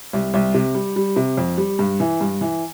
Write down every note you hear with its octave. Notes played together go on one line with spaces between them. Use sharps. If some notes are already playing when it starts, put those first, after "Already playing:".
C2
C2
C3
G3
G3
C3
F2
G3
G2
E3
G2
E3